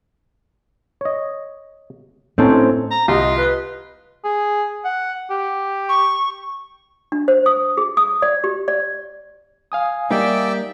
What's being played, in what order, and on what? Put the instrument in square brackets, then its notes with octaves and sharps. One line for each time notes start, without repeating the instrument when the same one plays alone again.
[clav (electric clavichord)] C#5 D#5
[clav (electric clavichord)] A2 D#4 A4 [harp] C4 C#4
[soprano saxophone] A#5
[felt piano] C2 [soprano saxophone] F4 [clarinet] D#5
[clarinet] B4
[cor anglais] G#4
F#5
G4
[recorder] C#6
[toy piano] D4
C5
D#6
G#4
D#6
D5
G4
D5
[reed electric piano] F5 G#5 D#6
[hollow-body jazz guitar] G3 A#3 D#4 [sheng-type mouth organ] D5 E5 G5